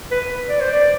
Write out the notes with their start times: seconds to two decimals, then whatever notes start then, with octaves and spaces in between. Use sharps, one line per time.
0.11 B4
0.49 D5
0.61 C5
0.72 D5